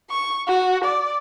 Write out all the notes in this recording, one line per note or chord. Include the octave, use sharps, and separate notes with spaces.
C#6
F#4
D5